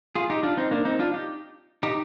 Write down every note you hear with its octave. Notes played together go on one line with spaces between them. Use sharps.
F4 G#4
D#4 G4
D4 F4
C4 D#4
A#3 D4
C4 D#4
D4 F4
D#4 G4
D#4 G4